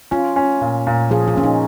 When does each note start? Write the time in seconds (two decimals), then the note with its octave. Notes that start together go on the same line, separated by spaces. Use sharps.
0.11 C#4 F4
0.36 C#4
0.61 A#2
0.87 A#2
1.10 F3 G#4
1.28 F4
1.35 A#2 C#4
1.44 D#4